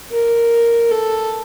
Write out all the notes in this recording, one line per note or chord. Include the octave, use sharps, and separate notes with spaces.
A#4
A4